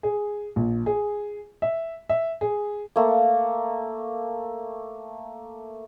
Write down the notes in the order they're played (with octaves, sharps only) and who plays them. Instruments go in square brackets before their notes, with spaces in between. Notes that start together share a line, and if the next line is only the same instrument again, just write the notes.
[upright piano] G#4
A#1
G#4
E5
E5
G#4
[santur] A3 A#3